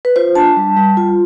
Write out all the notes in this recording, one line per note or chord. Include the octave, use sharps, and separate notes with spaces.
B4
F4 C5
D4 A5
G3
G3
F4